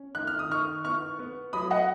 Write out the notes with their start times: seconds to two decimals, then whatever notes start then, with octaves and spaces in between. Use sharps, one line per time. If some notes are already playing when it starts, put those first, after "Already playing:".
Already playing: C#4
0.15 D#3 F#6
0.27 F6
0.39 D#6
0.50 D#3 C#6 F6
0.84 B3 C#6 F6
1.19 B3
1.53 F#3 B5 D#6
1.70 D#5 F#5